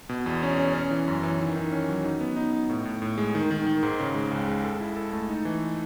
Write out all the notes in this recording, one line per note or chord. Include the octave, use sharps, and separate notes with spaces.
B2
E2
C#4
C#4
C#4
E3
F#2
E3
D#3
D#3
C#4
F#3
D#4
B3
D#4
D#4
A2
A2
A2
G#3
D#3
D#3
D#3
G#2
C#3
G#3
C#2
G#3
A4
E4
A4
A3
D#4
E3